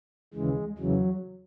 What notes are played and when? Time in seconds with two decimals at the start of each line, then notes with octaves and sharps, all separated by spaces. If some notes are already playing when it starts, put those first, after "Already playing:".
0.34 D#2 C#3 E3 G#3
0.78 E2 C#3 E3 F#3